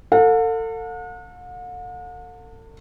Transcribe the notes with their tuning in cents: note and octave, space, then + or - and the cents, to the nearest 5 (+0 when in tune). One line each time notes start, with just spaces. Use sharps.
A4 +35 F#5 -45